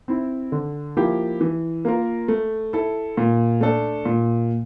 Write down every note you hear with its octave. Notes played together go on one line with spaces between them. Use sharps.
C4 E4
D3
F3 A#3 E4 G4
E3
A#3 F4 A#4
A3
E4 A4
A#2
A3 D4 A4
A#2